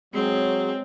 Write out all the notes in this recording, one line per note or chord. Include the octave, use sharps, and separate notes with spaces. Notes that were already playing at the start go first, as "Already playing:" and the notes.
F#3 G#3 C4 G#4 C#5